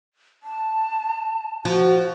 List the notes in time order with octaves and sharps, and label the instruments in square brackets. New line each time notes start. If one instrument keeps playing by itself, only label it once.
[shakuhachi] A5
[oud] F3 [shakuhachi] F#4